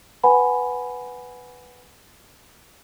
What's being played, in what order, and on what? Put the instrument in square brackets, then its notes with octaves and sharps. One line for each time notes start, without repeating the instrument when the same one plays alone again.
[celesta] B4 F#5 G#5 B5